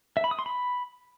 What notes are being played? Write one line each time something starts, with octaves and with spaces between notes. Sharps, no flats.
E5
B5
D#6
C6
B5